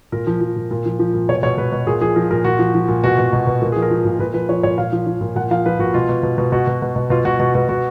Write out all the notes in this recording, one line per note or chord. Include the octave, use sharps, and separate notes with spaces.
A#2 A#4
F3
F3
A#2
A#2
F3
F3
A#2
B2 C#5
B2 C#5
B2 B4
B2
A#2 G#4
F3 G#4
F3 A#4
A#2 A#4
A#2 F#4
F3
F3
A#2
B2 F#4
B2
B2
B2
A#2 A#4
F3 G#4
A#4
F3
A#2
A#2 B4
F3 B4
F3 C#5
A#2 C#5
A#2 F5
F3
F3
A#2
A#2 F#5
F3 F5
F3 B4
A#2 F#4
B2 F4
B2
B2
B2
B2 F#4
B2
B2
B2
B2 F4
B2 F#4
B2 F#4
B2 F#4
B2 F#4